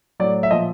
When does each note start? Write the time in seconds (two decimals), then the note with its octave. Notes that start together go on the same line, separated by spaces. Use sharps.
0.20 A2 F#3 D5
0.43 E5
0.51 A#2 F3 D#5